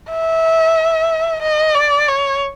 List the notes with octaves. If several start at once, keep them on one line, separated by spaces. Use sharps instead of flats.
E5
D#5
D5
C#5